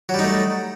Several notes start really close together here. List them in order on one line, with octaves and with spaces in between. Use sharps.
F#3 G3 D#4 A3